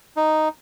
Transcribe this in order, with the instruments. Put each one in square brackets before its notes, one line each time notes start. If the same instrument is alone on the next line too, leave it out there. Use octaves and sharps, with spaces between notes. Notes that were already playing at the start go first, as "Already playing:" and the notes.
[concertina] D#4